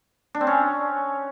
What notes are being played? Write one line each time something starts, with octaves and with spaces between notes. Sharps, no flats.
D4
C4
C#4